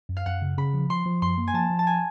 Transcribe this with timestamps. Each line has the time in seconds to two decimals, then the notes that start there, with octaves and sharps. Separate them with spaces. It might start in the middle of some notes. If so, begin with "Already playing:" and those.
0.09 F#2
0.17 F5
0.26 F#2 F#5
0.42 C#3
0.57 C#3 B5
0.74 F3
0.90 F3 C6
1.06 F3
1.22 F#2 C6
1.38 A#3
1.47 G#5
1.54 F3 A5
1.70 F3
1.79 A5
1.87 G#5